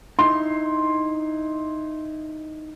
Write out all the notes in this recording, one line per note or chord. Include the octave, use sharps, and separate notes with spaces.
D#4 E4 C6